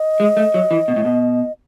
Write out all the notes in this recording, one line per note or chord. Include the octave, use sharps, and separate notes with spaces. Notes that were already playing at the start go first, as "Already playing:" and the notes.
Already playing: D#5
G#3
A3
F#3
E3
B2
A2
B2